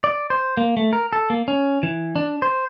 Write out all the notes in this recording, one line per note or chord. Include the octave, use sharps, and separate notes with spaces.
D5
C5
A#3
A3
A#4
A4
A#3
C#4
E3
D4
C5